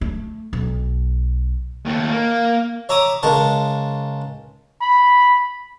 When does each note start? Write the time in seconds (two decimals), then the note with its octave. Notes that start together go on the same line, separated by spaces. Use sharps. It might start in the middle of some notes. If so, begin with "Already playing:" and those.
0.01 A3
0.53 B1
1.85 D#2 A3
2.12 A#3
2.89 C#5 E5 A#5 D6 D#6
3.23 C#2 G#3 A#4 A5 C#6
4.82 B5